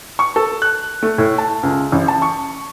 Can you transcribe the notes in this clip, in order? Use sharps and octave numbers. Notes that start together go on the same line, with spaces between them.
C#6
A4
F#6
A3
A2
A5
C#2
A1
A5
C#6